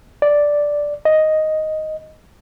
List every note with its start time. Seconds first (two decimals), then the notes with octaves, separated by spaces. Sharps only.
0.22 D5
1.05 D#5